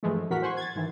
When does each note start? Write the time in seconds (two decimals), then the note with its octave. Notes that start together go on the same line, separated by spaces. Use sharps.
0.03 G2 E3 F3 G#3 A3
0.30 E2 A2 F#4 A#4 F#5 B6
0.42 C5 F#5 G#5 C6 C#6
0.57 G#6 A6
0.75 G#2 D#3 E3